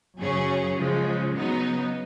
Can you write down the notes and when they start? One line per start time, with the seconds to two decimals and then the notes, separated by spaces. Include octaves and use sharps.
0.19 F#2 C#3 F#3 C#4 G#4
0.76 C#3 F3 G#3
1.34 C#3 F#3 B3 D#4